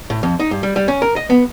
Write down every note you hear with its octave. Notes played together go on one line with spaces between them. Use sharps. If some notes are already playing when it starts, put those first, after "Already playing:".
A2
F2
D#4
G2
G3
G3
C#4
A#4
D#5
B3